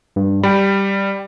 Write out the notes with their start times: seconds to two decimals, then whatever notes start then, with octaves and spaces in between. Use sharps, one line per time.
0.16 G2
0.43 G3 G5 B5